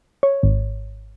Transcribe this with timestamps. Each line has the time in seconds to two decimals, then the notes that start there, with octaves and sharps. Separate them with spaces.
0.23 C#5
0.43 G#1